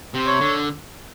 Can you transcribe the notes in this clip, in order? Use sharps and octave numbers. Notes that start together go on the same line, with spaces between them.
C3
C#5
D3